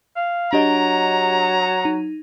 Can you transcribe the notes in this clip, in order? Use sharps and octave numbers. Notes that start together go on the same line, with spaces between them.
F5
F#3 D4 G4 D#5 A#5
D#4